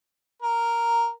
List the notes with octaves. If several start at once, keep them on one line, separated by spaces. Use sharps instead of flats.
A#4